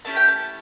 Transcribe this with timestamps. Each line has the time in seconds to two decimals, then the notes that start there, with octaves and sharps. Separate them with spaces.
0.05 A3 C#4 E4 G4 A5
0.16 G5
0.28 A5